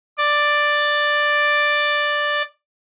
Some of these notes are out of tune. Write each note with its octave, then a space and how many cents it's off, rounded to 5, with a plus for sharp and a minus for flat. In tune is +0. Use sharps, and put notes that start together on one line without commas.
D5 +5